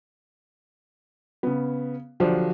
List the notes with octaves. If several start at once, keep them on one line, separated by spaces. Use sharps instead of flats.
C#3 B3
D3 F3 F#3 D4 G4 C5